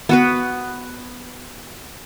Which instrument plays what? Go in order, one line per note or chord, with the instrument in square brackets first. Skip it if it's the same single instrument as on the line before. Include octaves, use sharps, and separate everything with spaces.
[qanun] B3 F#4 B4